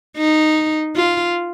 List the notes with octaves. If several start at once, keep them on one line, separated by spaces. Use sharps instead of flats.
D#4
F4